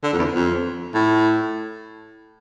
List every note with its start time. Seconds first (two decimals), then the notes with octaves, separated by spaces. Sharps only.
0.03 D3
0.13 F2
0.18 E2
0.34 F2
0.94 A2